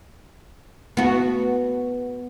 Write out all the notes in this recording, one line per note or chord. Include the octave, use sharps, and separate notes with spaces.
B3 F#4